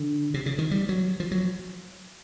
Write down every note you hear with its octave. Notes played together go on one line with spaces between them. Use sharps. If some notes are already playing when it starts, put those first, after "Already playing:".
Already playing: D3
C3
C#3
D#3
G3
F#3
F3
F#3